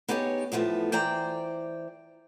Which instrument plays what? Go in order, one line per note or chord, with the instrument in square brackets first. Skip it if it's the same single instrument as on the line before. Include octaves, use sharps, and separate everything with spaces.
[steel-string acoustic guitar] B3 D#4 G4 G#4 C#5
E2 A2 F3 A3 B3
E3 C5 D5 G5 A#5